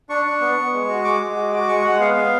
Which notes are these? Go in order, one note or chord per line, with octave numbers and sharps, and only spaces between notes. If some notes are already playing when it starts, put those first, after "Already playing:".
D4 C#6
D4
B3
B3
G#3
F#4
G#3 D6
G#3
F#4
F#4 D6
G#3 C#6
G#3 F#5
B3 F5
B3